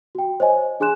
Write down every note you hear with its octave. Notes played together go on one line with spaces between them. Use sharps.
F#4 G5
C5 C#5 D#5 G#5
D4 G#4 G#5 C6 F#6 E7